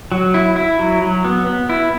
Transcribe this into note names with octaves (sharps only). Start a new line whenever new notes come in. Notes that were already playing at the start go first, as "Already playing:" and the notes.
F#3
E4
E4
F#3
F#3
B3
B3
E4